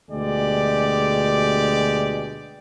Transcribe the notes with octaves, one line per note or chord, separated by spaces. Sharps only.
D2 B2 G#3 G4 D5